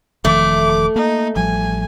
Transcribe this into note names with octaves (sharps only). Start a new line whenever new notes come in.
E1 D#3 F3 A3 D6
A#3 D#4
A1 F3 G3 G#5